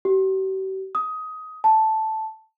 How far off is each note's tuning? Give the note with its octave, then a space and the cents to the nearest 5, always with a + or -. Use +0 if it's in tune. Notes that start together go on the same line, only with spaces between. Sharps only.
G4 -45
D#6 +15
A5 -5